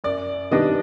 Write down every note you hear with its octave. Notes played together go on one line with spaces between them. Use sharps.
F#2 D5
D#3 G3 B3 D4 D#5